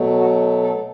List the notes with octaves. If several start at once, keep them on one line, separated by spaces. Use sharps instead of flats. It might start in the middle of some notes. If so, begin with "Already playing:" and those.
Already playing: B2 F#3 A3
F#4
A4